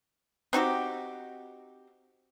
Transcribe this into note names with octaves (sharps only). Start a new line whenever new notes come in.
C4 D#4 F#4 G4